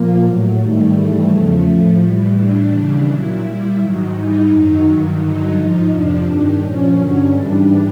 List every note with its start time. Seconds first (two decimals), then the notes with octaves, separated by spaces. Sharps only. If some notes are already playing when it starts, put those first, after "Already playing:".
Already playing: A#2 F3 A#3
0.24 A2 F#3
0.59 G#2 D#3 G3 A3
0.95 G#2 E3 G3 A3
1.30 E2 C#3 F3
1.66 A2 F3
2.01 A2 E3 G3
2.36 A2 E3 G3 D4
2.72 D#2 C#3 E3 G3
3.07 A#2 F#3 E4
3.43 A#2 G3
3.78 G#2 D#3 F#3
4.13 G#2 E3 G3 D#4
4.49 F#2 D#3 F#3
4.84 G2 D#3 F#3
5.19 G2 D3 F#3 D#4
5.55 G#2 F3
5.90 F2 C3 F3 D4
6.25 G2 D#3 G3
6.61 A#2 F3 C#4
6.97 G2 D3 F#3
7.32 G#2 E3 G3 D4